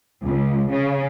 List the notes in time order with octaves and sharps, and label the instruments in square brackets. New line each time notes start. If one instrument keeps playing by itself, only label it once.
[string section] C#2
C#3